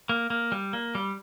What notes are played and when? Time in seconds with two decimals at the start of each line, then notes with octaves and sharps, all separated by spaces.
0.09 A#3
0.30 A#3
0.52 G3
0.73 A#3
0.95 G3